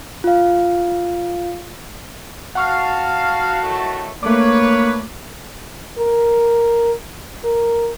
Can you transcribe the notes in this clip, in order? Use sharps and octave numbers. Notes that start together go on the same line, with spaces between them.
F4 F5
F#4 F5 F#5 A5 C#6 F6
A2 D#3 A3
A3 A#3 D4 B4 C#5 D6
A#4
A#4